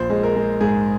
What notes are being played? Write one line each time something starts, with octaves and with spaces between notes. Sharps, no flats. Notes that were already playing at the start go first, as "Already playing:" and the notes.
Already playing: A#1 C5
G#3
A#4
G#3
G#2 G#4